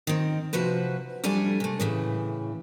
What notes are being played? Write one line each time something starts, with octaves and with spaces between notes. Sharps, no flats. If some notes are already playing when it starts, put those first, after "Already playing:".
D#3 C4
C3 F3 F#4 B4 C5
F2 G3 A3 D4 G#5
C3 A3
A2 C#3 E3